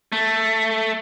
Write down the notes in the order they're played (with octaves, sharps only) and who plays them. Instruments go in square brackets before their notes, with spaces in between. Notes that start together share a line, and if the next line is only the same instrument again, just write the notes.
[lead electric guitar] A3